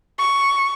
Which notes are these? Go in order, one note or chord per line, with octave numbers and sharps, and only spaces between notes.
C#6